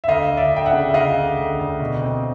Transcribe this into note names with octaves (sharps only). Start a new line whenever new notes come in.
E5
D2 D#5 F5
D2
D5 E5
D2 G5
E5 F#5
C#3
E5
C#3 D#5 F5
D2
D2
D2
B2
C4